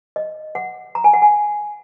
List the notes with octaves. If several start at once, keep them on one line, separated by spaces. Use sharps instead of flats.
D#5
F#5
A#5
G#5
F#5
G#5